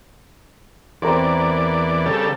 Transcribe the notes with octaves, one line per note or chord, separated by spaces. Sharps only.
E2 C4 A#4 D5 C#6
C#3 G3 A4